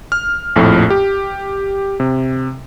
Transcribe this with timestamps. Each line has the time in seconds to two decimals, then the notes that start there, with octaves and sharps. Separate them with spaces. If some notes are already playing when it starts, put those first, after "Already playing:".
0.12 F6
0.56 A#1 F2 A2 A3
0.90 G4
2.00 C3